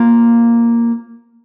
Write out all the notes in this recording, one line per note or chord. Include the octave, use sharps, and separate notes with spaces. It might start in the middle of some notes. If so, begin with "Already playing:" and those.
Already playing: A#3 F4 C5